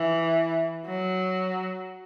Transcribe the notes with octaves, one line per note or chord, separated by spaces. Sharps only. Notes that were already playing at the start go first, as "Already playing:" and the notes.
Already playing: E3
F#3